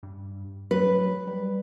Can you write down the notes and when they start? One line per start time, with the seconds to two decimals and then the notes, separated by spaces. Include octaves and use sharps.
0.03 G2
0.71 F#3 B4
1.27 G3